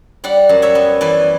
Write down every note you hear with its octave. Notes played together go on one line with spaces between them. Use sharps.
G3 D5 F#5
F#2
C#5 E5
B3
E3 B4 D5